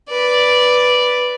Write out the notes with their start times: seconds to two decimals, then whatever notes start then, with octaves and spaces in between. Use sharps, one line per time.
0.10 B4 D5